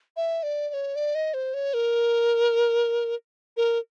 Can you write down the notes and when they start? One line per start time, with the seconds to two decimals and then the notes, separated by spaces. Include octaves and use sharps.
0.17 E5
0.43 D5
0.69 D5
0.74 C#5
0.96 D5
1.15 D#5
1.34 C5
1.54 C#5
1.74 A#4
3.57 A#4